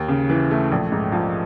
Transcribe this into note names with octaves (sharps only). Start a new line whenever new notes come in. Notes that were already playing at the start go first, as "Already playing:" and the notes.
Already playing: D#2
C#3
E3
A3
A#1
G#2
F3